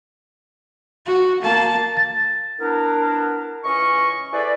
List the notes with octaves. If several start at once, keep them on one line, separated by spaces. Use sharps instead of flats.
F#4
A#3 A5
A6
B3 D4 E4 A#4
C#2 E3 C#4 D#5 C#6
E4 G#4 A4 B4 C5 D5